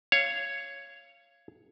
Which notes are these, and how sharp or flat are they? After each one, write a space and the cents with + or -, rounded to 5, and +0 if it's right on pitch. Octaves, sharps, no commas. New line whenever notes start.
C#5 +0 F5 -20